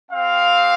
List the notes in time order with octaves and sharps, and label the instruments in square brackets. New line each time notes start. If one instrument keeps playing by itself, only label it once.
[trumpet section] C4 G4 F5